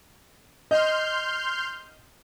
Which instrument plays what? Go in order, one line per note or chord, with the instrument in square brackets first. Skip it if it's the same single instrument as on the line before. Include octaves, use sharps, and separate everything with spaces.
[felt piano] D#5 [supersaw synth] C6 F6 G6